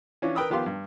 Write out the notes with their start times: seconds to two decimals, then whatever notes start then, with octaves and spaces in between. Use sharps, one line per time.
0.22 E3 C#4 D4 F4
0.35 A#4 B4 G5 B5 D#6 E6
0.50 D#3 F3 B3 G4 F5 C6
0.66 G2